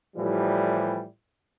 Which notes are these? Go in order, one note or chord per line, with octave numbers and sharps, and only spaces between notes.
A2 E3 F3 G3